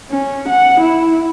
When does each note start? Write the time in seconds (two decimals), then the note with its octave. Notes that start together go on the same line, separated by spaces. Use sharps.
0.10 C#4
0.49 F#5
0.80 E4